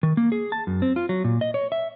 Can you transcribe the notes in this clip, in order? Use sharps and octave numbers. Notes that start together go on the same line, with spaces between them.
D#3
A#3
G#4
A5
F#2
C4
F4
F#3
A#2
D#5
C#5
E5